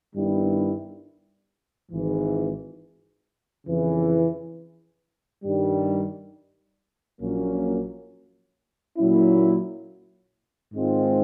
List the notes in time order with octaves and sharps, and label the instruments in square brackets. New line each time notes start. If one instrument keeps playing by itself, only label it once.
[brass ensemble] G2 D#3 G3 B3 E4
G#1 G#2 E3
F2 C#3 E3
G2 D#3 G3
A#1 A#2 F#3 A#3 C#4
A#2 F#3 A#3 C#4 E4
G#2 D#3 G#3 C4 F4